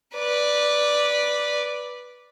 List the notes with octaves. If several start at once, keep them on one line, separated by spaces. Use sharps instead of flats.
B4 D5